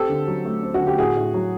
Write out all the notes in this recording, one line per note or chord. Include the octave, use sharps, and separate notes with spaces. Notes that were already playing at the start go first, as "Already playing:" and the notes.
Already playing: C4 G4 A4
D3
F#3
A3
C4
F#4
D3
G4
A2 F#4 G#4
A2
F#3